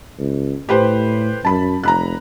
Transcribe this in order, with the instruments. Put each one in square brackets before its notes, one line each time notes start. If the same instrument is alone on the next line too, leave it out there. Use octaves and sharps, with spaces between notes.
[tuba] C#2
[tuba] A2 [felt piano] G4 B4 C5
[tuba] F#2 [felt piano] A5 B5
[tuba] F1 [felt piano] A#5 B5 F#6